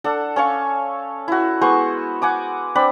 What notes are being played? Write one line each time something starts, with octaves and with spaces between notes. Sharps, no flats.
D4 A4 F#5
C#4 C#5 F5 C#6
E4 F#4
G#3 B3 C5 C#6
F#5 G#5 D6
C4 D4 B5